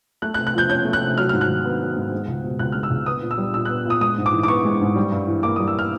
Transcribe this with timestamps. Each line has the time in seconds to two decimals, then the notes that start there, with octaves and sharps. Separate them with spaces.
0.22 A3 F#6
0.34 F#6
0.38 C3
0.47 F#6
0.55 F3 G6
0.70 C#4 G6
0.85 A3
0.93 F#6
1.02 C3
1.17 F#3 F6
1.29 F6
1.33 G#2
1.41 F#6
1.48 D#3
1.64 B3
1.81 F#3
1.97 G#2
2.12 G#3
2.28 C#2
2.44 B2
2.59 C#2 F#6
2.72 G#3 F6
2.83 E6
2.91 C#2
3.06 B3 D#6
3.22 A#2
3.31 E6
3.38 G3
3.54 A#2 E6
3.65 F#6
3.69 B3
3.86 A#2 D#6
4.01 G#3 D#6
4.18 G#2
4.26 D6
4.33 E3
4.43 D6
4.48 B3 C#6
4.65 G#3
4.81 G#2
4.96 G3
5.12 G2
5.27 E3
5.43 A#3 D6
5.56 G3 D#6
5.68 E6
5.79 F6